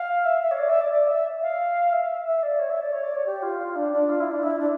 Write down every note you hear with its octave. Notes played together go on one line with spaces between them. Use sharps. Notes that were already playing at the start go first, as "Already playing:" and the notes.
Already playing: F5
E5
E5
C#5
D5
E5
D5
D5
E5
F5
E5
E5
D5
C#5
E5
D5
C#5
D5
C#5
G4
F4
F4
D4
D4
F4
E4
D4
E4
D4